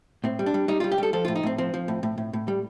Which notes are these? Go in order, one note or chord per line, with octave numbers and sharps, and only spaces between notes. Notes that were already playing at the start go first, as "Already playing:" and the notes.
A2 C4
G3
D4
G3
G3 D#4
G3 F4
G4
G3 A4
F3 A4
A2 F4
D#4
A2 C4
F3 C4
F3
A2
A2
A2
A2
G3